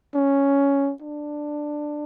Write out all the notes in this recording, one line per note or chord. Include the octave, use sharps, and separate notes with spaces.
C#4
D4